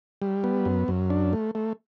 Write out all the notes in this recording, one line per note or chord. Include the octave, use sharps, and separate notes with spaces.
G3
B3
F#2
F#2
D4
A3
A3